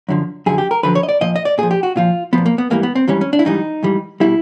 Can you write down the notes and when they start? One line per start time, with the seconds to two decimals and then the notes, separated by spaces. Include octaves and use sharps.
0.09 F#2 D3 F3
0.46 F#2 D3 F3 G#4
0.58 G4
0.71 A#4
0.83 F#2 D3 F3 B4
0.95 C#5
1.03 D#5
1.09 D5
1.21 A#2 F3 D#5
1.36 D#5
1.45 D5
1.58 A#2 G#4
1.63 F3
1.71 G4
1.83 F#4
1.96 A#2 F3 F4
2.33 A#2 F3 B3
2.46 A#3
2.58 B3
2.70 G#2 E3 G3 A#3
2.83 B3
2.95 C4
3.08 G#2 E3 G3 C#4
3.21 C#4
3.33 D4
3.39 E4
3.45 G#2 E3 G3 D#4
3.83 G#2 E3 G3
4.20 B2 G3 E4